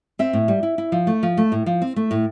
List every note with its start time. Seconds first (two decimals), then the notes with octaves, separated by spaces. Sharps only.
0.19 C4 E5
0.33 A2
0.48 G3
0.63 E4
0.78 E4
0.92 F3
1.07 A3
1.23 F3
1.37 A3
1.52 A2
1.66 F3
1.82 C4
1.96 A3
2.11 A2